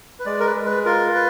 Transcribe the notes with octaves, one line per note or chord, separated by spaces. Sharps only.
B4
G#3 D5
A#4
B4
G#3
B4
F4 A#4
B4